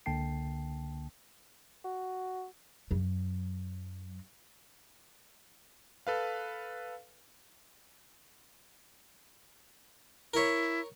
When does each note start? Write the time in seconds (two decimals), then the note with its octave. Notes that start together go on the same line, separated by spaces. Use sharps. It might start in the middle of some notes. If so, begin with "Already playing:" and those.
0.06 C#2 D3 A#3 G5 A5 C7
1.85 F#4
2.91 F#2 F#3
6.07 A4 B4 F5
10.34 E4 A#4 C#5